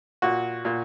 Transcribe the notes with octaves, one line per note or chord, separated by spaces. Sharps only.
A#2 F#4
A#2